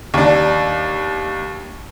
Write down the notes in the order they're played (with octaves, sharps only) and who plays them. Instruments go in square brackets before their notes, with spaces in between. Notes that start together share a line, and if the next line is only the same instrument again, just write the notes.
[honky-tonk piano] D#2 D4